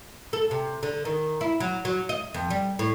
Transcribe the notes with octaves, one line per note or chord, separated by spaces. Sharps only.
A4
C3
D3
D#3
E4
F#3
F#3
D#5
F2
G3
A2